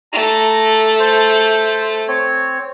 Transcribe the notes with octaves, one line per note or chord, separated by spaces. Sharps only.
A3 A#5
C5
C4 C#5